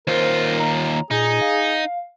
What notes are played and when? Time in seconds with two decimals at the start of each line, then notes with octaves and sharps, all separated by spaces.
0.07 D#2 F4 A#4 C5
0.59 A#5
1.11 A#2 D#4 G#4
1.41 F5